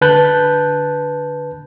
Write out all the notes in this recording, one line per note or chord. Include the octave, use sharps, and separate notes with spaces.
D3 B4 A5 F#6 G6